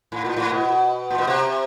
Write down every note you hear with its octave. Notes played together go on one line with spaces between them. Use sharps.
A2
A#2
A2
B2
A#2
B2
C3